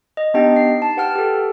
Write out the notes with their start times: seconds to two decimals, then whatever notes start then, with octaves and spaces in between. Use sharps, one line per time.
0.17 D#5
0.34 B3 D4 D#4 G4 D#5 G5
0.56 C7
0.82 A5
0.97 G4 B4 F#5 G5 A5 F6
1.15 G4 A4